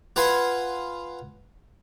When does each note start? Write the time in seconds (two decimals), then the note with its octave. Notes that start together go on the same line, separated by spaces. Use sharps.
0.16 F4 B4 F#5 G#5 C6